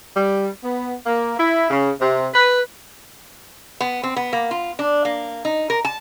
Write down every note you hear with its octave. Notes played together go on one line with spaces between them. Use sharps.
G3
B3
A#3
E4
C#3
C3
B4
B3
C4
B3
A#3
F4
D4
A#3
D#4
A#4
A5